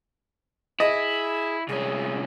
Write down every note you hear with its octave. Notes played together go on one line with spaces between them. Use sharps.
E4 G#4 D#5
C2 C#4 G#4